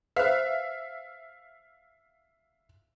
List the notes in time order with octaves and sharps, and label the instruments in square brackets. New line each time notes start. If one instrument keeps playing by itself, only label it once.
[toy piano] B4 C5 [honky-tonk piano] E5 F5